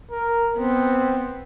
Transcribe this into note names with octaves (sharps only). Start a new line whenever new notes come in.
A#4
B3 C4